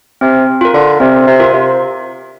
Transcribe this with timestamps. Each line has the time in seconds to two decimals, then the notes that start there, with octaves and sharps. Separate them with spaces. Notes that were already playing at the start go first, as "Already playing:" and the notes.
0.21 C3 C4
0.61 F4 A#4
0.74 D3
1.00 C3 C4
1.27 C3
1.40 F4 A#4
1.53 C3